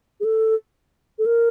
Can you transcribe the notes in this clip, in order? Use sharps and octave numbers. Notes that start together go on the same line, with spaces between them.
G#4
A4
A4
A#4